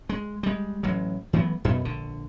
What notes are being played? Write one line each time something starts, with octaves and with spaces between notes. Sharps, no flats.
G#3
G3 G#3
A1 F#3
E3 F#3 A3 B3
F#2 B2 B3
A#1 D3